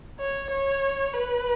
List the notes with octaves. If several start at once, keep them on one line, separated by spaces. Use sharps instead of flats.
C#5
C#5
B4